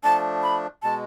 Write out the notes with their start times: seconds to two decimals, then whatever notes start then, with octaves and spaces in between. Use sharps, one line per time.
0.03 F3 A3 D4 A5
0.43 B5
0.83 B2 G#3 A5